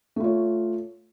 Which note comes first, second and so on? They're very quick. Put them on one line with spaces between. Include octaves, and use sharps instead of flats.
A3 F4 C#5